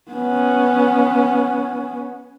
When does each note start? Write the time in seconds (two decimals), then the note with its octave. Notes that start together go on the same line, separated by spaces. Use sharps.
0.11 B3 C#4